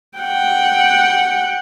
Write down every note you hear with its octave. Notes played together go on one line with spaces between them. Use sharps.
F#5 G5